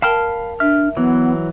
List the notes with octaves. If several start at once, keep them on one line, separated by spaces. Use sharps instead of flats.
A#4 F5 G5 A5 B5 F6
D4 E5 F6
E3 F#3 B3